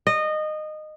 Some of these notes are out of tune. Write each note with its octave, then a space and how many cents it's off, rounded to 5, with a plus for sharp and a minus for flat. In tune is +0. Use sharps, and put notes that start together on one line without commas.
D#5 -20